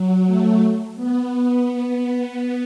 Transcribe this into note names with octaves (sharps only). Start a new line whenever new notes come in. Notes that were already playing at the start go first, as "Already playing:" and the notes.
Already playing: F#3
A3
B3